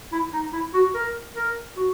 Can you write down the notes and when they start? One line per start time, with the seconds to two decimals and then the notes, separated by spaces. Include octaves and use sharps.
0.12 E4
0.33 D#4
0.53 E4
0.74 F#4
0.95 A#4
1.36 A#4
1.76 F#4